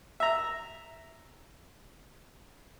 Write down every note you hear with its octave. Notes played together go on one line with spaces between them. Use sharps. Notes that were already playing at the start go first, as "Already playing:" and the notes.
E5 A#5